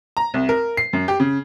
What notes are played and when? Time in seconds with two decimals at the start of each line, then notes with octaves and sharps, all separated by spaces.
0.17 A#5
0.34 C2
0.49 A#4
0.77 C7
0.93 F#2
1.08 G4
1.20 C#3